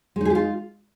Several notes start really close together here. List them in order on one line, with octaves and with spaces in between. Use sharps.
G#3 D#4 G#4 G4 F4